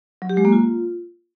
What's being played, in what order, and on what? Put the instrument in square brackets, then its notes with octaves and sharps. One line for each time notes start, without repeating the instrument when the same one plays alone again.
[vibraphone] F#3
G4
G#3
A#3
F4